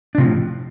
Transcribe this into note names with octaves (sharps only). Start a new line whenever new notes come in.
D4
A2 C3 F3 C4